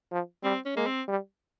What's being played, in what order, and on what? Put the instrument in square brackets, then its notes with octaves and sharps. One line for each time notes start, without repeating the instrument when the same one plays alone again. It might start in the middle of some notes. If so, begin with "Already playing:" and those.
[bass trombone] F3
[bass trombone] G3 [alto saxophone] C4
[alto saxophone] C#4
[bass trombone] G#3 [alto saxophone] A#3
[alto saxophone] C4
[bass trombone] G3